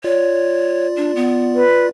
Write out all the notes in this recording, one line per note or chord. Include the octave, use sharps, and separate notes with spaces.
F4 C#5 D5
D4
B3
B4